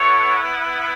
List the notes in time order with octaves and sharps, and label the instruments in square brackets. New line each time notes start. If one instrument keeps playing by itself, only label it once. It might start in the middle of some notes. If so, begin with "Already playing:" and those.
Already playing: [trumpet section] B3 E4 A4 C#5